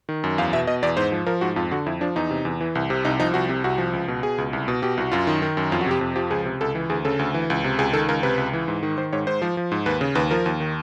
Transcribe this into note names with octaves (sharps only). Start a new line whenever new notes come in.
D#3
F#2
E2 F5
B2 E5
B2 D#5
E2 D5
G#2 C5
F3
F3 A#4
G#2 F#4
F2 F4
D3 F#4
F2 E4
F3 D4
E2 D#4
C3
E2
E3
C2
C3
C2 D#4
F3 D#4
C2 F#4
C3
C2 F#4
F3
C#2
B2
B2 G#4
C#2
C2
B2
B2 G4
C2 F#4
F#2 F4
D#3
D#3
F#2
F2 F4
F#4
C3 G4
F2
F3 G4
C#2 G#4
C3
C#2 A4
E3
D2 G#4
C#3 A4
D2
E3
C#2
C3
C#2 G#4
D#3 A4
C#2 A#4
C3 B4
C#2
E3
G#2
D#3
D#3 C5
G#2 C#5
G#2 C5
F3
F3
G#2
D#2 B4
C#3
D#2 B4
F3 A#4
D#2
D#3